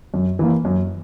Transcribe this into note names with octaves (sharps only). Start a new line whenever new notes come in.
F#2
E3 A#3
F#2